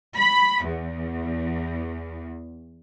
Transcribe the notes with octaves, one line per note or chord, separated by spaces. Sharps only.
B5
E2